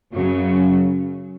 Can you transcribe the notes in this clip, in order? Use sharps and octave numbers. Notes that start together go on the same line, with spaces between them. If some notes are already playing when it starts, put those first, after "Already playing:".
F#2 C#3 F#3